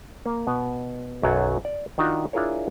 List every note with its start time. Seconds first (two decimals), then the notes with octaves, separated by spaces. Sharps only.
0.26 A#3
0.47 B2 B3
1.23 B1 F#2 F#3 F#5
1.65 D5
1.98 D#3 D4 D#4 F4 F#4
2.33 D4 E4 F4 G#4 A#4 C#5